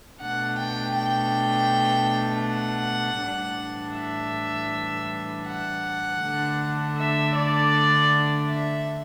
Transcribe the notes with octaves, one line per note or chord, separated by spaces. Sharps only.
B2 A3 D4 F#5
G5
G5
F#5
A2 E3 G3 D4
E5
F#5
D3 A3 D4
E5
D5
E5